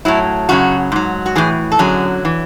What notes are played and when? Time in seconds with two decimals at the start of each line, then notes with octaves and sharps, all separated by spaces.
0.05 A2 F#3 E4
0.49 F#2 C#3 F#3 F#4
0.92 G#2 F#3
1.26 F#4
1.36 A2 E3 G#4
1.72 A4
1.79 F#2 D3 F#3 G#4
2.25 E3